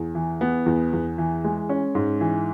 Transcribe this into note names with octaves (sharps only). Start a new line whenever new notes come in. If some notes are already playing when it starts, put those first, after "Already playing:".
Already playing: E2
E3
B3
E2
E2
E3
G#3
C#4
G#2
E3